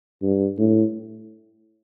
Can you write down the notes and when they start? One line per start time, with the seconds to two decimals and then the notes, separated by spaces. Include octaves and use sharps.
0.22 G2
0.58 A2